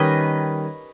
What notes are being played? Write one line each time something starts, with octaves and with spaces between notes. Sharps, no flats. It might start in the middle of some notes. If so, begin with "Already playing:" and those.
Already playing: D#3 G3 C#4 B4 D#5